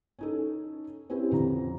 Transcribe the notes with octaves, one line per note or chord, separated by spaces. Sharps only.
C#4 D#4 A4
C4 C#4 E4 G4 B4
F2 D3 A#5